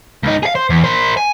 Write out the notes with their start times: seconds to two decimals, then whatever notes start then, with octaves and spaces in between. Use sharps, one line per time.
0.24 C#2 D#4
0.43 G#4 F5
0.55 C5
0.70 E2
0.84 A#4 C5
1.17 G#5